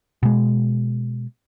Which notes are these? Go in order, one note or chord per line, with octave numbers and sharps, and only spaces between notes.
B2 G#3